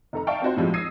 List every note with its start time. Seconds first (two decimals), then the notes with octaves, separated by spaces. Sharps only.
0.13 F1 A4 A#5
0.27 D5 E5 F5 G5 A5 C#6
0.42 C4 F4 F#4 C5
0.56 A2 C3 F3 G3 G#3
0.74 D#6 E6 G#6 A#6 C7 D#7